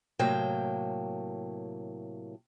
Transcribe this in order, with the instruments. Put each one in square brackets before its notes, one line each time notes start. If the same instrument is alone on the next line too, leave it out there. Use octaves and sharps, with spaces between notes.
[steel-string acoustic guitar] A2 C3 F#3 A#3 G5